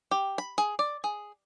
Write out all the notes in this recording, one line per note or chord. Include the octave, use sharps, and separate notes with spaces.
G4
B5
G#4
D5
G#4